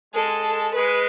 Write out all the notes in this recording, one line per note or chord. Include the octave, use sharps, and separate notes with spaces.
G#3 A4
G#3 B4